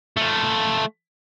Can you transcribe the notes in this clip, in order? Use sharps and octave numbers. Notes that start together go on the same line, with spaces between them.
A3 F4